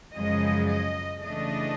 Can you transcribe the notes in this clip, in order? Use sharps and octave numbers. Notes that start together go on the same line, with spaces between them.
F#2 C#3 F3 G#3 D#5
D#5
C#3 E3 A3 D4 D#5